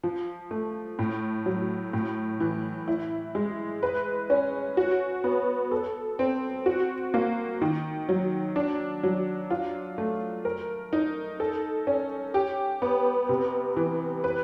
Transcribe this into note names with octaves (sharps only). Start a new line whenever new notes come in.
F3
A3
A2
F#3
A2
E3
E4
G#3
B4
C#4
F#4
B3
A4
C4
F#4
A#3
D#3
F#3
D4
F#3
F4
A3
A#4
D#4
A4
C#4
G4
B3
C3
E3
B4